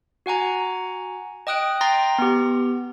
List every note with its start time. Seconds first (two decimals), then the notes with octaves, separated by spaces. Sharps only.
0.26 F#4 F#5 G#5 A#5
1.47 D#5 G5 D#6 F#6 D7
1.81 G5 A#5 C6 A6 A#6
2.18 B3 G4